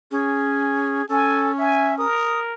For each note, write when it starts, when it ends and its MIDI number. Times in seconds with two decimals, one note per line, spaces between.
0.11 1.02 61
0.11 1.05 68
1.09 2.05 61
1.09 1.52 69
1.09 1.48 80
1.58 1.95 76
1.58 1.97 80
1.98 2.54 70
1.98 2.40 87